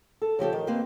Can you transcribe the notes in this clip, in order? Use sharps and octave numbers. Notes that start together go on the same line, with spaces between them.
A4
C#3 F3 G4 A4
D#3
A#3 C4 G4 B4 C5